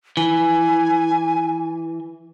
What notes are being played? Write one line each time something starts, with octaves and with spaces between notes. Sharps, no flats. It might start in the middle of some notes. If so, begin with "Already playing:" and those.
E3 G#5